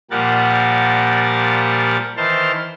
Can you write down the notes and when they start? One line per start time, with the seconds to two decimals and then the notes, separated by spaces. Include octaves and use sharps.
0.11 A#2 F3 G3 A#4 F#5 A6
2.17 D#3 E3 C5 A5 C6 F6